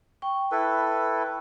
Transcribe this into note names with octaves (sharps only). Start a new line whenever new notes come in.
G5 C#6
E4 A4 B4